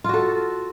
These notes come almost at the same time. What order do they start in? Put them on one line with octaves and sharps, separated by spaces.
F4 F#4 A4